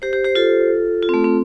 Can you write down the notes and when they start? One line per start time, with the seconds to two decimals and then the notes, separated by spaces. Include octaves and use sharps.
0.02 G4 C5
0.13 G4 C5
0.25 G4 C5
0.35 F4 A4
1.02 F4
1.09 C4
1.14 A3
1.24 C4